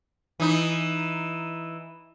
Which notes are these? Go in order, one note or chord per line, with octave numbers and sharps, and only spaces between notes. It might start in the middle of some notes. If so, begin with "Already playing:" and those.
E3 D#4